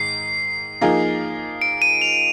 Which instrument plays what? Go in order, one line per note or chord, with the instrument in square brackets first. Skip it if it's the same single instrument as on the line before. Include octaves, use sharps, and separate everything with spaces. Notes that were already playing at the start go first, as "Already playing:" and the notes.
Already playing: [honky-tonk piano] G#2 D#3 [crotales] C7
[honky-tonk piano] F3 A#3 D#4 G#4
[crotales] D7
D#7
F7